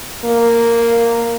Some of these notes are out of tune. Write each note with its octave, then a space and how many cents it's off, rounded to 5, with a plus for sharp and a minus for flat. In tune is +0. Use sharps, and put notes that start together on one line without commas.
A#3 -5